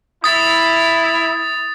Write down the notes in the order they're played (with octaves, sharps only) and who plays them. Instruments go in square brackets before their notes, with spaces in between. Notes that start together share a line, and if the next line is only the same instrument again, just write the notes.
[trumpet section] E4 [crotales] D#6 A6